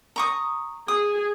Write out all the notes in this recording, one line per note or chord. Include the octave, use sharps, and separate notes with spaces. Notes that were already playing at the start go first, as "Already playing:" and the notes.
A#5 C#6 D#6
G#4 D#6